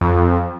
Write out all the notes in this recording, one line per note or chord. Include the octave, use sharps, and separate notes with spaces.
F2